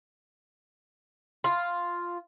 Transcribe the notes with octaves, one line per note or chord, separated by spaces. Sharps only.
F4